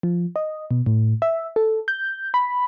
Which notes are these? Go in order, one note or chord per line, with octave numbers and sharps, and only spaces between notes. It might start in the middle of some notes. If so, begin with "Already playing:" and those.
F3
D#5
B2
A2
E5
A4
G6
B5